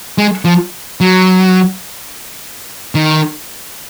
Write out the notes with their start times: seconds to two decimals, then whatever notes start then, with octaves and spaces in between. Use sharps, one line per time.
0.18 G#3
0.45 F3
1.01 F#3
2.95 D#3